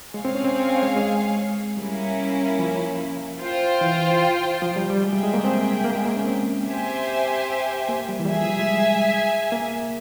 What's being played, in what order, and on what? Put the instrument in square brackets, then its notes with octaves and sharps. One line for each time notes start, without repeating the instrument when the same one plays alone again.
[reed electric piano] G#3 [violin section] G#4 C#5 F5 G#5
[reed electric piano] C4
C#4
C4
C4
C4
G#3
G#3
[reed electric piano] G3 [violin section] A#3 C#4 E4
[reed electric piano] F3
[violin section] F4 C5 G5
[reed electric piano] E3
F3
G3
G3
[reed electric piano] G#3 [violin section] G#4 E5 G5
[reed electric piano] G3
G#3
A#3
C4
A#3
G#3
A#3
C#4
C4
[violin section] G4 C5 E5 G#5
[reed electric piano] A#3
G3
E3
G3
[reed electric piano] F3 [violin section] G#4 E5 G#5
[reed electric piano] F3
G3
G#3
A#3